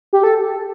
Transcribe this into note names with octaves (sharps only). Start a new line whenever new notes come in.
G4
A4